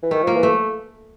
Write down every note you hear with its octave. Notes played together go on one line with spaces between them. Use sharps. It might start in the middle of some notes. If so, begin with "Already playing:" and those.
E3
D#3 A3
F3 A#3
E3
A3